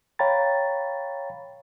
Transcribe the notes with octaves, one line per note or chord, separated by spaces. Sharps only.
C#5 F5 G5 A#5 B5 A6